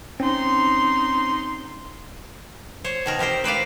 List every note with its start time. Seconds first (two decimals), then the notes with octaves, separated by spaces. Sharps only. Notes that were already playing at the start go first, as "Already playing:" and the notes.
0.20 C4 C#4 D#4 C6
2.84 C5 C#5
3.06 B2 D#3 A#4
3.19 C4 G4 A#4 C5
3.44 B4 C5 D5 F5